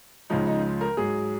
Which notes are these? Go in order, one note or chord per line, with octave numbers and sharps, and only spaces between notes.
C#2 C#3 F3 G#3 D#4
D#4
A#4
G#2 F#3 G#4